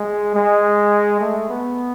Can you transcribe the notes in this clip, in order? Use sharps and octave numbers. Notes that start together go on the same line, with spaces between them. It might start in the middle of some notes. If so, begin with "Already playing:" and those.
Already playing: G#3
G#3
A3
B3